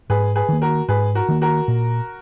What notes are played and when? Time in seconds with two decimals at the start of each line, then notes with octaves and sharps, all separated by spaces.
0.10 G#2 G#4 B4
0.35 G#4 B4
0.49 D#3 A#3
0.62 F#4 A#4
0.88 G#2 G#4 B4
1.15 F#4 A#4
1.29 D#3 A#3
1.41 F#4 A#4
1.68 A#2